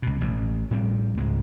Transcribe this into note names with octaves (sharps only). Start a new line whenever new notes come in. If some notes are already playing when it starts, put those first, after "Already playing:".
C#2 B2
A1
A2 G3 C4
C#2 G#2 G#3